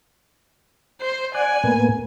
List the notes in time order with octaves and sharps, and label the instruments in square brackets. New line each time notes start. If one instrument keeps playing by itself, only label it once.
[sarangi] C5
[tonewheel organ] D5 F#5 [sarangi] G#5
[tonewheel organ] A2 A#3 B3